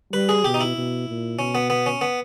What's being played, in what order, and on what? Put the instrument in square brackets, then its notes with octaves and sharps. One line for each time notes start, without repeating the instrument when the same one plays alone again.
[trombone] G3 [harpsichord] B4
[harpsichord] G#4
[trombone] B2 [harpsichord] G4
[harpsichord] D#4
E4
[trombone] B2
A#2
[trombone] B2 [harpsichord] C#4
[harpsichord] B3
B3
C#4
B3